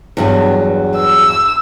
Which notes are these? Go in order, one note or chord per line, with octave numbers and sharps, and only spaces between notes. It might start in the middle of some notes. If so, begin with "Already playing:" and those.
E2 G2 F#3
E6